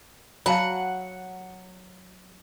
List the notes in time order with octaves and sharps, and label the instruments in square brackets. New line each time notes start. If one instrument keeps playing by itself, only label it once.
[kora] F#3 [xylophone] F5 A5 B5 [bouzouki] F#5